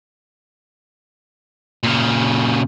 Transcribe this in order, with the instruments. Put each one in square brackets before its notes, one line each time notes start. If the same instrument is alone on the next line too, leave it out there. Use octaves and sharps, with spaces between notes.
[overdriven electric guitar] A#2 C#3